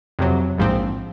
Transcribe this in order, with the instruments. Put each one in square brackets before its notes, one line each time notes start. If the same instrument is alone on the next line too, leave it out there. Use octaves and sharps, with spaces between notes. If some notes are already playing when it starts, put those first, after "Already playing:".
[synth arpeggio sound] F2 C3 F#3
A#1 G#2 F3 C4